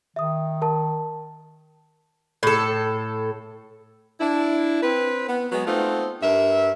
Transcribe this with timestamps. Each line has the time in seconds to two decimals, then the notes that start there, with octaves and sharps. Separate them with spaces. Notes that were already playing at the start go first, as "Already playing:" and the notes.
0.16 D#3 E5 D#6
0.62 A#4 A5
2.43 A2 A4
4.20 D4 E4
4.82 C4 B4
5.28 B3
5.51 F#3 G#3 B3
5.66 A3 B3 C4 D#4 F4
6.22 G2 A#4 E5